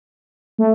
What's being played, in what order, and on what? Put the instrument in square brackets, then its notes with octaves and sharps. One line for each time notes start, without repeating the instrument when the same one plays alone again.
[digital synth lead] A3